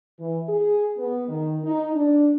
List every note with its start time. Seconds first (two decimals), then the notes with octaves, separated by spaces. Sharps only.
0.20 E3
0.49 G#4
0.99 B3
1.29 D#3
1.64 D#4
1.95 D4